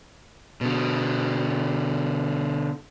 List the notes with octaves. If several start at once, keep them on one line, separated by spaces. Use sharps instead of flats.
B2 D3